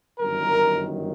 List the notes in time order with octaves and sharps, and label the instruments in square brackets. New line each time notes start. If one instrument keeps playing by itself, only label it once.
[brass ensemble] G1 F#2 D#3 A#4